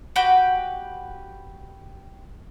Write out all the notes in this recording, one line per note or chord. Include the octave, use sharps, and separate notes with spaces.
F#4 G4 B4 G5